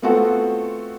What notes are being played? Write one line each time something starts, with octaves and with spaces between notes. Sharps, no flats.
A3 B3 C4 F4 F#4 A4